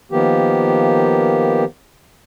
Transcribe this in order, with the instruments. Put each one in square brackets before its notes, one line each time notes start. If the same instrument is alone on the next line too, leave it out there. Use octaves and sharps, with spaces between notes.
[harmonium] D#3 F3 A#3 B3 G4